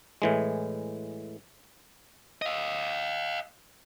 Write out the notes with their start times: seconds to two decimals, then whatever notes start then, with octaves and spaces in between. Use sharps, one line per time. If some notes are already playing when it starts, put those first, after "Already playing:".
0.22 A2 E3 G#3
2.42 D#5 F5